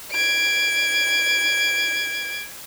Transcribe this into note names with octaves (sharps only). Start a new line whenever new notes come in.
G#6 D7